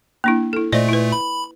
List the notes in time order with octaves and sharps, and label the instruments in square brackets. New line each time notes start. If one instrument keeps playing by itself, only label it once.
[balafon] A#3 D4 E4
E4 A4
[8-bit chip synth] A#2 A3 [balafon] C5 D5 D#5
[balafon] E4 B4
[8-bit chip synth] B5